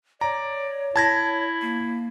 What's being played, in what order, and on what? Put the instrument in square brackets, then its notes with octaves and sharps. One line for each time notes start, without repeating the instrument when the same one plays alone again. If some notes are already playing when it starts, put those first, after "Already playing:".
[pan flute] C#5 [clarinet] D5 [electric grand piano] A#5
[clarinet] E4 [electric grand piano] A5 G#6 A#6
[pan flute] A#3